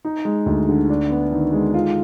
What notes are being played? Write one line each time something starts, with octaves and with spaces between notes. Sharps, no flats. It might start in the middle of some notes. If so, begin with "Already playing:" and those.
D#4
G#3
D2
D3
D4
B3
D#3
G#3
F4